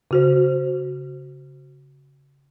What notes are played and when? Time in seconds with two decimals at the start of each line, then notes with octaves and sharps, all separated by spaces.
0.11 C#3 F#4 C5